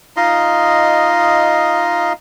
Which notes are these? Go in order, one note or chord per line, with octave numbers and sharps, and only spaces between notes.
D#4 F4 D#5 C6